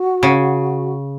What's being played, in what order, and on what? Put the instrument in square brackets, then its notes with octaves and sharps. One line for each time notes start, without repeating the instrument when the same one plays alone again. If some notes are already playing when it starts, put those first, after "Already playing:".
Already playing: [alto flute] F#4
[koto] C#3